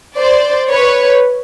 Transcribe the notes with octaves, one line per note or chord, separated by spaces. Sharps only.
C5 D5
B4 C#5